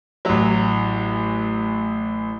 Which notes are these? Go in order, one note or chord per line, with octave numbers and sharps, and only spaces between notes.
A1 F#3